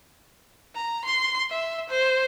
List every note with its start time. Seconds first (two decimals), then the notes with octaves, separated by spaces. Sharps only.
0.75 A#5
1.05 C6
1.50 E5
1.89 C5